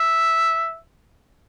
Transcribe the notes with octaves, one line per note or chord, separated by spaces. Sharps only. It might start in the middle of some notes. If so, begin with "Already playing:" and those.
Already playing: E5